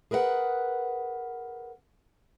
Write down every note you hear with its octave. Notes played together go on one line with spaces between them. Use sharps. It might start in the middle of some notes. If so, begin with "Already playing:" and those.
G#4 A#4 B4 E5 F#5